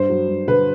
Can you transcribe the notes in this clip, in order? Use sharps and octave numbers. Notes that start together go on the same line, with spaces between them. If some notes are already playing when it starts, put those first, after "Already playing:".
Already playing: G2 C5
F#3
G2
D3 B4